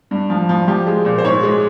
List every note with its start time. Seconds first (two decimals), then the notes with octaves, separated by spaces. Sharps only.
0.11 G2
0.30 F3
0.49 F3
0.68 F3 G4
0.87 G#3
1.05 A#2
1.18 C5
1.24 G#2 C#5
1.43 G#3